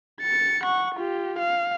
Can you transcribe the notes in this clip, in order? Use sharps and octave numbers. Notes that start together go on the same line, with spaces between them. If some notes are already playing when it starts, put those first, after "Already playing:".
A6 C#7
F#5 C#6
F4 G4
F5